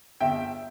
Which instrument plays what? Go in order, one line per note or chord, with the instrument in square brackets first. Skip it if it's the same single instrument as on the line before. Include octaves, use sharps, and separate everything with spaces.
[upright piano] G1 E5 G5